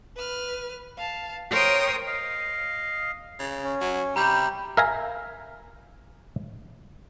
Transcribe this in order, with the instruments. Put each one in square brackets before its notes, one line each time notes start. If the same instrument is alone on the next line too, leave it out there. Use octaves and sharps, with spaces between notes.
[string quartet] B4 F6
F5 A5
A#4 C5 C#5 G5 C6 D#6
[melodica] D#5 F5
[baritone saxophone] C#3
[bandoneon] C#4
[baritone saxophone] F#3
[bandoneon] C3 G5 [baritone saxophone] G3 [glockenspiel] A#5 B5 G6
[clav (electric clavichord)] A#4 E5 F5 G#5 A#5